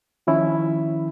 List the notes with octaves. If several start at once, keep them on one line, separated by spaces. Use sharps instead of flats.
D#3 F3 C#4 E4